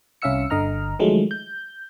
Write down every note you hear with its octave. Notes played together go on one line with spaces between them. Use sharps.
C2 C#4 E5 F5 E6 C#7
G1 D3 D#5 A#5 F6
D#3 F3 F#3 G#3 A3
G6